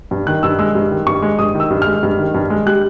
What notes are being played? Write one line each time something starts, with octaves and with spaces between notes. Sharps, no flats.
G2
D#3 F#6
G2 E6
G#3 E6
G2
D#3
G2 C#6
G#3
G2 D#6
D#3
E6
G2
G#3 F6
G2
D#3
G2
G#3
G3 F#6